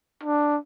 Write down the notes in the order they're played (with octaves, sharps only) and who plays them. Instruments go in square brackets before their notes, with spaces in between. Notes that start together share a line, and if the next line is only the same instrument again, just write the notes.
[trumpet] D4